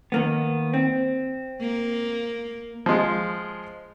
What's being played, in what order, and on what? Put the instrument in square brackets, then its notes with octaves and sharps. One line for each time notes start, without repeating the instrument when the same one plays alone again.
[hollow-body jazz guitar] D#3 A#3 B3
C4
[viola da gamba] A#3
[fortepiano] F3 G#3